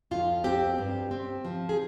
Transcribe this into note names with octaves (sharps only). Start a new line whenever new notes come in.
F2 F4
C4 G4
G2
C4
F3
G#4